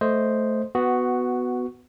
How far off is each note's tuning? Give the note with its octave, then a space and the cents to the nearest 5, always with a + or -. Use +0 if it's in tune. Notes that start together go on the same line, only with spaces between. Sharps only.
A3 -5 C5 +0 D#5 -5
B3 +10 F#4 +0